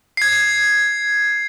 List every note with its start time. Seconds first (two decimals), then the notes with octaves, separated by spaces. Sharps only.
0.17 G#6 C7